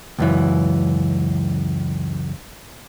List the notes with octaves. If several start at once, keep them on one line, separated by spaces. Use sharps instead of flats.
C#2 F#2 E3